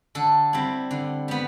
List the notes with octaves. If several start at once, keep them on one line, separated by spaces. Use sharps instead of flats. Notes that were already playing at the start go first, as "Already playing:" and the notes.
D3 A4
G3 C4 E4
D3
G3 B3